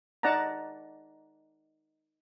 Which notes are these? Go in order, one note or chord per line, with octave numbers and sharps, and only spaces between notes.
D#4 D5 F#5 A5 A#5